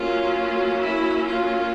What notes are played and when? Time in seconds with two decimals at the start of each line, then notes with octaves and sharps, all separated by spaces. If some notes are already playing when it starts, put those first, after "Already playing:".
Already playing: F#3 A#3 C#4 F4
0.81 E4
1.28 F4